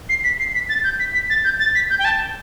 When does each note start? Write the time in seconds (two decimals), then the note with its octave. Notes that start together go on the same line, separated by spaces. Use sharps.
0.09 C7
0.24 B6
0.39 C7
0.54 B6
0.69 A6
0.84 G6
1.00 B6
1.14 B6
1.30 A6
1.44 G6
1.59 A6
1.75 B6
1.90 G6
1.99 G5
2.05 A5